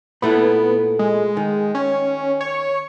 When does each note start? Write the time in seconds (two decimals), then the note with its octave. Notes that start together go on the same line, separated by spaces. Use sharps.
0.22 A#2 A3 B3 E4
0.99 G#3
1.37 D#3
1.75 C#4
2.41 C#5